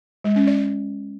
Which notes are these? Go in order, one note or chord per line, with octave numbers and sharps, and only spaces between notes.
G#3
C#4
D5